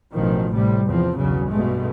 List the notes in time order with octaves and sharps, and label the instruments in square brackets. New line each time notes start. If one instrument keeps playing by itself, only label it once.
[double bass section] A1 B2 D#3 F3
A2 C3 G3
E2 F3 C4
B1 E2 G2 C#3 F#3
G2 B2 G#3 A3